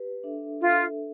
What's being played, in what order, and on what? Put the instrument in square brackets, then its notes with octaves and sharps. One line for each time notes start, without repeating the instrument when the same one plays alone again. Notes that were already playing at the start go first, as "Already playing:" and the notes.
Already playing: [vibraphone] G4 B4
D4 A4 E5
[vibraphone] D4 A4 E5 [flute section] F4